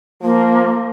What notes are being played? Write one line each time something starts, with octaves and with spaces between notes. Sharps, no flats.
F3 A#3